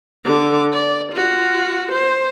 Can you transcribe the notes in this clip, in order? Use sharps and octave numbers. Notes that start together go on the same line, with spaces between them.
D3 D6
D5
F4 F#4
C5